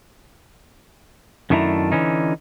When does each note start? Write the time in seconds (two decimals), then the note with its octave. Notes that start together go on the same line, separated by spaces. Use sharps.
1.50 F#2 D#3 A3 D4 E4 A#5
1.92 D3 E3 C#4 D#4